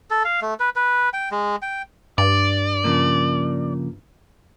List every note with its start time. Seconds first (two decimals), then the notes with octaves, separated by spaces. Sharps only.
0.11 A4
0.25 F5
0.42 A3
0.60 B4
0.76 B4
1.13 G5
1.31 G#3
1.62 G5
2.18 G2 D5
2.84 C#3 F3 A#3